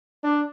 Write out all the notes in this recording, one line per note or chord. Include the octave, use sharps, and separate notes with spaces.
D4